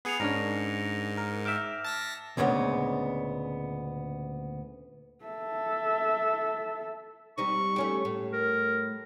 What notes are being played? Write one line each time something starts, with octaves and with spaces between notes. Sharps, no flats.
B3 G#4 C7 C#7 F7
G#2 C#4 D4 A#4 A#6 D7
A#4
E5 G5 D6 F6 E7
A5 A#6 B6
D2 A#2 C#3 G#3 B3
A4 E5
G3 C4 D#4 C#6
A3 C#4 G4
A2
A#4